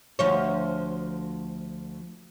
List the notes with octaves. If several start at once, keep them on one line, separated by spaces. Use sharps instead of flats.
D2 F3 C#5